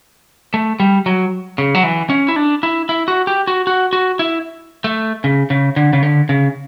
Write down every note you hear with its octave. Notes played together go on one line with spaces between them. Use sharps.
A3
G3
F#3
C#3
F#3
E3
C#4
E4
D4
E4
E4
F#4
G4
F#4
F#4
F#4
E4
A3
C#3
C#3
D3
C#3
D3
C#3